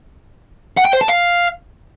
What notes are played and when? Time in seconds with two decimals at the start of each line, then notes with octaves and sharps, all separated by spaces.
0.77 F#5
0.85 G5
0.93 C5
1.01 A5
1.09 F5